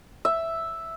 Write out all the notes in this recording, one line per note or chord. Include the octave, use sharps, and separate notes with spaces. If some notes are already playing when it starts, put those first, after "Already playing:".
E5